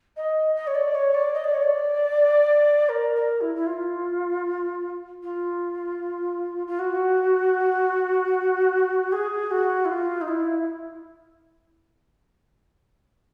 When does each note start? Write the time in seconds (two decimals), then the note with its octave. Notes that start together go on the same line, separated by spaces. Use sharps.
0.16 D#5
0.55 D#5
0.67 C#5
0.74 D5
0.94 C#5
1.14 D5
1.34 D#5
1.44 D5
1.54 C#5
1.62 D5
2.89 A#4
3.15 A#4
3.41 E4
3.55 E4
3.66 F4
5.23 F4
6.67 F4
6.79 F#4
9.12 G#4
9.51 F#4
9.85 E4
9.89 F4
10.21 D#4
10.28 E4